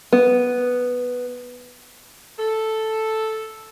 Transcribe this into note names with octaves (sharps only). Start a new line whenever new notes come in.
B3
A4